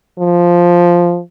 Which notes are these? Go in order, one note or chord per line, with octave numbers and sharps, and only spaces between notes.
F3